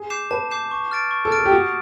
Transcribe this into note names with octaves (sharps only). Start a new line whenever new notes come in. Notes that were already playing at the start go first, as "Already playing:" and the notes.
Already playing: G#4
D6 G6 C7 E7
B4 A5
D6 G6 C7 E7
C#6
F6 A6 D7
C#6
A4
F6 A6 D7
A4
G4
F#4 D#6